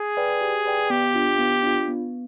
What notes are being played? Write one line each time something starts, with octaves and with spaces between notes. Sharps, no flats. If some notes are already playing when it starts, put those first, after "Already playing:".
Already playing: G#4
B4 D5 G5
G4
B4 D5 G5
B3 G4
D4 F4
B3
D4 F4
B3